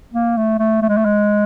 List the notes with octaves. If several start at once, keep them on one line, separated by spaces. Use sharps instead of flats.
A#3
A3
A3
A3
G#3
A3
G#3